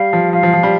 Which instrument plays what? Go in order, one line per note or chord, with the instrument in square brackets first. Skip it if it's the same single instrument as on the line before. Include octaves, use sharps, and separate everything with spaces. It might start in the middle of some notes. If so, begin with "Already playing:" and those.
Already playing: [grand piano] G3 [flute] F5
[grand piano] F3
[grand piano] F3 [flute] F5
[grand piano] F3
F3
G3